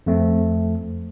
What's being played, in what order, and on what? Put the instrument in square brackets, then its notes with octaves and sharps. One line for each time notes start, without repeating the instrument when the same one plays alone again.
[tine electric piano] F2 A3 C4